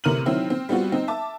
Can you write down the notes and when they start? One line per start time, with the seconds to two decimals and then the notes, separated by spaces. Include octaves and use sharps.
0.04 A1 C3 A#4 F6 D#7 F#7
0.25 D#3 F#3 C4 E4
0.50 C4
0.69 G3 B3 C4 F4 F#4
0.92 C4 D#4
1.08 E5 A5 D6